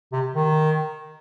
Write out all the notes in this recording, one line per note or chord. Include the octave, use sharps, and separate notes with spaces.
C3
D#3